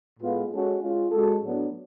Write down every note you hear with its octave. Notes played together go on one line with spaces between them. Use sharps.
A2 G#3 B3 F4 B4
G#3 C#4 F#4 A4
G#3 C#4 F4
G#3 C#4 F#4 A4
A2 F#3 B3 D4